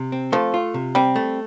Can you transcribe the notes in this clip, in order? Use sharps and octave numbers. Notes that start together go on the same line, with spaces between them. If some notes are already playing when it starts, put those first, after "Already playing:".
Already playing: C3
C4
F3 A3
F4
C3
G3 C4
A3